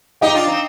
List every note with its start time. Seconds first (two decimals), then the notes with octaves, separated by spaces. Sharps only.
0.21 D#4 G4 D#5 G5
0.35 D4 F4
0.47 C4 D#4